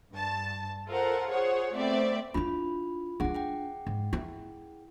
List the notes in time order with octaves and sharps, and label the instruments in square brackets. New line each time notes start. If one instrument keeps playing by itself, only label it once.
[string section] G2 A5
F4 A4 A#4 C5 F#5
G#4 C5 C#5 F#5
A3 B3 C4 D5 E5
[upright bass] D4 E4 [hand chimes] F4 B5
[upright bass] D4 F4 [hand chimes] G#4 F#5
[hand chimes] G#4 F#5 G5
[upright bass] G#2
E4